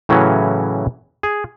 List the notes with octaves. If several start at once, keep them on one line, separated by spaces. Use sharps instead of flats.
A2 C#3 E3 F#3 C#4
G#4